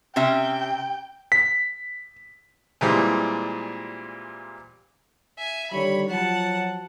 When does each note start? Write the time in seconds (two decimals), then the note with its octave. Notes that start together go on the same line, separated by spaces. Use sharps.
0.16 C3 C#4 E5 G5
1.32 B6
2.81 A#2 E3 G3 G#3 C4
5.38 E5 G#5
5.71 D3 D#3 G3 C#5 B5
6.09 F3 F#3 F#5 A5